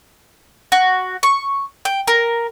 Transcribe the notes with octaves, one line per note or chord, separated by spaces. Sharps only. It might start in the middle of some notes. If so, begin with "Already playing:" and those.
F#4
C#6
G5
A#4